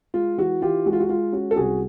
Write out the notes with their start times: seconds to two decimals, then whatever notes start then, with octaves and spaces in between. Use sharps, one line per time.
0.14 G#3 F4
0.38 E3 F#4
0.62 E3 F4 G4
0.86 G#3 F#4
0.93 F4
1.00 F#4
1.09 G#3 F4
1.32 C#4 F#4
1.51 A4
1.56 C2 F#4 G#4